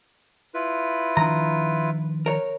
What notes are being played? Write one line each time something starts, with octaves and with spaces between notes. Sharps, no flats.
E4 F4 B4
D#3 F3 D4 A#5
A#4 C#5